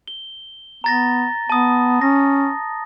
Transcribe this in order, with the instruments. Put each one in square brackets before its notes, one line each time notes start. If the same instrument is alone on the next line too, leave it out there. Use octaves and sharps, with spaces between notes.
[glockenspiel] G7
[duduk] B3 [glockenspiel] A#5 A6 A#6
[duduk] B3 [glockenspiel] A5 D#6
[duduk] C#4 [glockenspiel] A#6